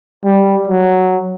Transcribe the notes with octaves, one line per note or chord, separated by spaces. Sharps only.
G3
F#3